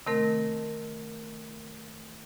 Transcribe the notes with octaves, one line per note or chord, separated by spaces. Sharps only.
C3 D#3 A3 C4 A#4